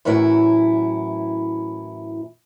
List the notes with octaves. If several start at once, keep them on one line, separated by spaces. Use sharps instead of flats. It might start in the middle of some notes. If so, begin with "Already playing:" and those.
F#2 A2 E3 F#3 E4